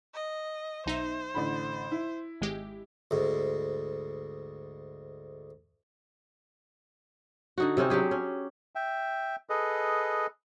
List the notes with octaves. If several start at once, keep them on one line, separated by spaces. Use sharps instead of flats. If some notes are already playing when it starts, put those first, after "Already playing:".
D#5
B1 D#4 C5 E5
A1 D3 B5
E4
G#1 G#3 G4
D2 G#2
D3 D#4 F#4
C3 C4 C#4 D#4
F#3 D4 G4 G#4
C#4
E5 G5
G#4 A4 B4 D#5